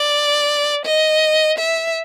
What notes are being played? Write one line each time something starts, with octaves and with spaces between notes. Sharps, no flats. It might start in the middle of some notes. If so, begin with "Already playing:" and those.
Already playing: D5
D#5
E5